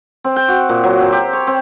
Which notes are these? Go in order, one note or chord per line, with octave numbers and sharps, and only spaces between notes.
C4
G5
F#4
A#2
F#3
C4
G4
C#5
C4